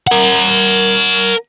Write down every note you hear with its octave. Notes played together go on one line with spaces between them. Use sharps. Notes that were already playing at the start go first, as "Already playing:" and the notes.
A#4 F#5